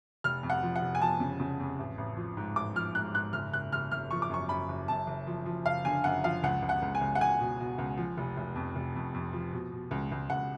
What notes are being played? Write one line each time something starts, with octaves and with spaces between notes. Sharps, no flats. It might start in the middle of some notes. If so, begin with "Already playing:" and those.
F1 F6
F2
F#5
F3
F#5
F1
G#5
F3 A5
C#3
C#3
F2
A1
A1
F3
G#2
A1 D6
F3 F6
G#2 F#6
G#2 F#6
F#1 F6
F#1 F#6
F#1 F6
F#1 F6
F3 C#6
D6
F#2 C#6
F#2 B5
F#1
F#2 A5
F#1
F3
F3
F#1 F5
D3 G#5
F#2 F#5
F3 F5
C#2 F#5
C#2
F#5
C#2
G#5
C#2
F#5
C#2 G#5
B2
B2
C#2
F3
F1
F1
F2
F1
F2
F2
F3
B2
B2
C#2
C#2
C#2 F#5